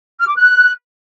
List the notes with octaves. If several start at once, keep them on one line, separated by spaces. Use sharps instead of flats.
F6
D6
F#6